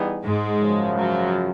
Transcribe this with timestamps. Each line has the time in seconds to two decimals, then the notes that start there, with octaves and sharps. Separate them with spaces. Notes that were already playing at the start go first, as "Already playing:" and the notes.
Already playing: E3 G3 B3 D#4 G#4
0.23 G#2 G#3
0.60 F#2 C#3 F3
0.96 F#3